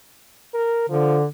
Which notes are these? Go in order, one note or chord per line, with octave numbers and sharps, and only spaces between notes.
A#4
D3 F3